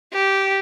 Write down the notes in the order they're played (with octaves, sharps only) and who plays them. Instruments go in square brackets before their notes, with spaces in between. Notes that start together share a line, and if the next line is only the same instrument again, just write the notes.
[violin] G4